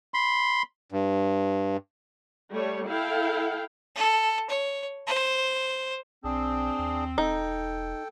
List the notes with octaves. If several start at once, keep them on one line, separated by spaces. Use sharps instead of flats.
B5 C6
G2
G3 A3 C#5
E4 A4 F5 G5
A4
C#5
C5
B1 C4 D4 G#4
D#2
E1 D#4 A4 G5